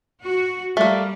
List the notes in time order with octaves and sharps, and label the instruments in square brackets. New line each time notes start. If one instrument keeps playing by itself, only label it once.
[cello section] F#4
[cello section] G3 [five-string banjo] A3 A#3